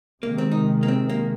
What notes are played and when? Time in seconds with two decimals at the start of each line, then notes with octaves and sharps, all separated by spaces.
0.23 C3 D#3 G#3 A#3
0.38 C4
0.51 D#4
0.83 A#3
0.88 C4
1.09 A#3